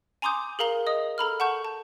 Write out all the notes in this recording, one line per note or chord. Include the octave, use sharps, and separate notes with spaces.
G#5 A#5 C6 D6 D#6 G6
G#4 A#4 F5 A#5 G7
D#5 D#6
A4 A#5 B5 F6
F#5 A5 C#6 G6
A5